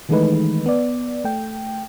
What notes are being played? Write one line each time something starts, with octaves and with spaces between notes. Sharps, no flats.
D#3 E3 G#3 A3 D#4 B4
B3 D5
A3 G5